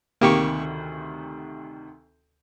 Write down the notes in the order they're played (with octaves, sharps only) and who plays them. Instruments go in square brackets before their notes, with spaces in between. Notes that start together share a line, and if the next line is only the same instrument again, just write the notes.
[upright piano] D2 C3 D#3 [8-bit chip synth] A#3 G4 C#6